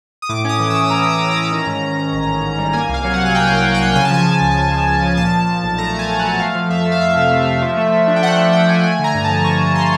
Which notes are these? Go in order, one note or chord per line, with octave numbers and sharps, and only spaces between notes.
D#6
A2 D6
C#4 D#6
E3
E3 E6
A2 A#5
C#4
A#5
E3
A#5
C#4
D#3
G#2
D#3
G#2
A1
G#2
G#2
G3
A#3 G#5
C2
F5
F#3 F5
F#5
C2
G#5
C2 G5
C2 F5
F#5
F#3
G5
C2
C#3 G#5
A5
F3 G#5
F3
C#2
C#2
F3
C#2
F3
A#2 A5
A#2
A#2
B1
A3 A#5
A3 G#5
F#3
F#5
A3
A3 F5
F3
F2 E5
A3
F5
F2 E5
C3
A3
A3
F3
A3
A3
D4
G5
A3 F#5
A3 F#5
A3 G5
D4 G#5
A3 G#5
D3 A#5
G2
F3 A5
D3 C#6
D3
D3 C6